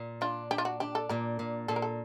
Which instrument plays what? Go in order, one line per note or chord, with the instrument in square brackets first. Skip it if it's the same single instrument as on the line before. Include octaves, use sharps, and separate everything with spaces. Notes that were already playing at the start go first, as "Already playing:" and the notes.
Already playing: [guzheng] A#2
[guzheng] D4 [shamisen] F4
[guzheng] D4 [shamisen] G4
[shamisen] F4
F#4
[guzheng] D4 [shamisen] G4
[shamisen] A4
[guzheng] A#2 [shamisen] A#4
[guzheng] A#2
[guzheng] A#2 [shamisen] A4
[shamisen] A#4
A4